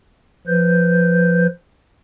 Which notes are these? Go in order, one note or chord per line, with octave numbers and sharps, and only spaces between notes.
F3 B4 G6